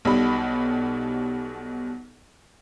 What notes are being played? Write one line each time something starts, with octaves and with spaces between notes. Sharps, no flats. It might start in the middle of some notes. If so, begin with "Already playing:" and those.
B1 B2 G3 B5